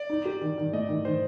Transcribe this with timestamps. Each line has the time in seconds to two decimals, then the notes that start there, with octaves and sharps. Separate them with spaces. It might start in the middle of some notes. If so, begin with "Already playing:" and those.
Already playing: D5
0.10 D#4
0.25 G4
0.41 D#3
0.58 D#3
0.73 A3 D#5
0.89 D#3
1.05 D#3 C5